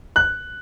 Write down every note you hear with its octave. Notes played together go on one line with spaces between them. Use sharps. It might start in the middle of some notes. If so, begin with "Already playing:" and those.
F#6